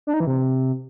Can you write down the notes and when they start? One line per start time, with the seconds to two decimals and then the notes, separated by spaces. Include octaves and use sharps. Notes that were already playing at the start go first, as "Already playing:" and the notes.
0.07 D4
0.14 D#4
0.20 E3
0.27 C3